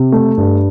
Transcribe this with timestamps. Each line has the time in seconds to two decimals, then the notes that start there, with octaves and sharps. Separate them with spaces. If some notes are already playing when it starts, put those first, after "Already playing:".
Already playing: C3
0.12 A3
0.38 G2